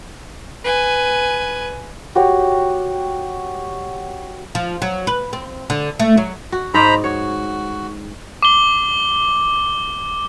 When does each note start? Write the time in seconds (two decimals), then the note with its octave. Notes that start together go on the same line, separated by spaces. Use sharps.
0.64 B4 G#5
2.15 F#4 G4 C#5
4.55 F3
4.82 F#3
5.07 B4
5.33 C4
5.70 D3
6.00 A3
6.18 F#3
6.52 F#4
6.74 G#2 C5 D5 D#5 A#5 B5
7.04 F#4 C#5
8.42 D6 G7